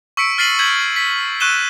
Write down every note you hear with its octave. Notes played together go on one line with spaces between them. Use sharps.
C#6 E6 B6 C#7 D7
F6 A6 B6 C7 D#7 F#7
G6 G#6 B6 F#7
B6
C#6 E6 F#6 D#7 E7 G7